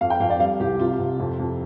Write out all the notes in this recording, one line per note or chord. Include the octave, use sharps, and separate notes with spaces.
F2 F5
G5
F2 F5
D5
G3 F5
C2 G4
C3 F4
C3
F2
F2